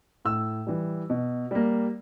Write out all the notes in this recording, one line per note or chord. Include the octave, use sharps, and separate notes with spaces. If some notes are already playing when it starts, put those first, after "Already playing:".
A2 E6
E3 G3
B2
G3 A#3